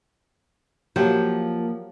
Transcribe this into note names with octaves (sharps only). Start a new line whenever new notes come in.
F3 F#3 A#3 G4 C5